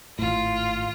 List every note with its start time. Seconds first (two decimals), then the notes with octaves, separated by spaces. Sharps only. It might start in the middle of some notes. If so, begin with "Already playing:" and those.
0.19 G#1 A2 F4